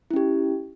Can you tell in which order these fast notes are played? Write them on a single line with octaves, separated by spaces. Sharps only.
E4 C#4 G4